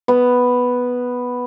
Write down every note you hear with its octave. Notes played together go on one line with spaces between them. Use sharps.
B3